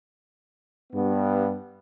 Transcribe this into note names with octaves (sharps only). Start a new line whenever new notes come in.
G2 B3